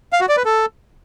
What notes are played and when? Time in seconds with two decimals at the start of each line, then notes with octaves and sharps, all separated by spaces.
0.13 F5
0.21 F#4
0.29 D5
0.37 B4
0.45 A4